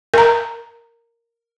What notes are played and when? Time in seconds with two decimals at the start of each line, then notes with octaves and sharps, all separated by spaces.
0.14 A#4 A#5